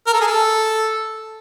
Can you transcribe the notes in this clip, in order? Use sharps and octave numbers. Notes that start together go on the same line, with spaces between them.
A#4
A4
G#4
A4